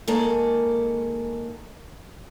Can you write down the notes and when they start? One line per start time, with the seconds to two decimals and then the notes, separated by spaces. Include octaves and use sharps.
0.08 D#3 G#3 A#3 G#4 A4